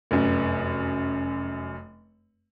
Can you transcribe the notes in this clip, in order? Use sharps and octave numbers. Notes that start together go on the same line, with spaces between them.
F1 F#2